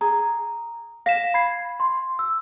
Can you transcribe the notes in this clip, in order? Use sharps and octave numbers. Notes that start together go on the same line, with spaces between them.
G#4 A#5
F5 A#6 B6 E7
B5 G#6 C7
C6
E6